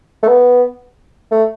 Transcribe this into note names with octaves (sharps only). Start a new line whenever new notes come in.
A3
B3
A3